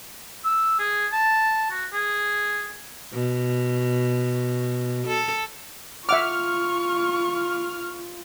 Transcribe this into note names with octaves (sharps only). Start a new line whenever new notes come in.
E6
G#4
A5
F#4
G#4
B2
A4
F4 E5 F#5 C#6 D6 F6